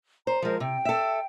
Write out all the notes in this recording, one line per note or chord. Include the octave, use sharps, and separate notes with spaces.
C5 A#5
F3 G#3 A#4 C5
C3 G5
A4 E5